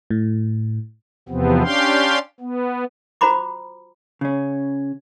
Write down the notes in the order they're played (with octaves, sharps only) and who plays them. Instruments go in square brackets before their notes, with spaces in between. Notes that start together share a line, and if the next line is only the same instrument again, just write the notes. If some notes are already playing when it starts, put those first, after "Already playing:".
[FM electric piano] A2
[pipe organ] E2 C3 F3 B3 C4
C#4 D4 G4 F5 G5 C6
B3
[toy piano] F4 F#4 C5 A#5 B5 D6
[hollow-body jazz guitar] C#3 C#4